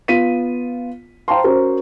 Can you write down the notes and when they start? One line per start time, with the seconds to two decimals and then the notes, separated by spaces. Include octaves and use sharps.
0.08 B3 F4 B6 D#7
1.28 C5 F5 G5 A5 A#5 C6
1.44 C#4 F#4 A#4 C5